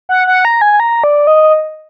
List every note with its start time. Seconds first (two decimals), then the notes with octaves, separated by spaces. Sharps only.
0.09 F#5
0.27 F#5
0.45 A#5
0.61 G#5
0.80 A#5
1.04 D5
1.27 D#5